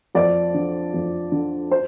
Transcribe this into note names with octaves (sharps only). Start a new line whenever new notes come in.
F2 D5
D3
F2
D3
C5